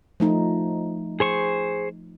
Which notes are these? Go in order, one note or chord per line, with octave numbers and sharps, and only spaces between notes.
F3 A3 D#4
G#4 C5 C#6